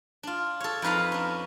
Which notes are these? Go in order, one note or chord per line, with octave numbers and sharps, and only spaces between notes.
D4 F4
A4 C#5
F2 D#4 B4 F5 A#5
C#4 D4